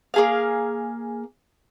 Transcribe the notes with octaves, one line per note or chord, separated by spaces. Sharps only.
A#3 G#4 F5